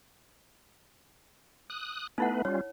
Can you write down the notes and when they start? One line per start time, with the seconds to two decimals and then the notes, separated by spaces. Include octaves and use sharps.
1.70 D#6 F#6
2.18 A3 B3 D#4 E4 B4 F#5
2.45 G3 C#4 F4 C#5